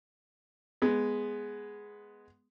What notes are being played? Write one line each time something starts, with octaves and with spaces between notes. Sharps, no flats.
G#3 B3